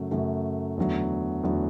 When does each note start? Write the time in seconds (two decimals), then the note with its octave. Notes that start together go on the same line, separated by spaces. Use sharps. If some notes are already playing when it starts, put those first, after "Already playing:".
Already playing: F#2 C#3 F#3 A3
0.11 F#2 C#3 F#3 A3
0.77 E2 D3 F#3 A3
1.43 E2 D3 F#3 A3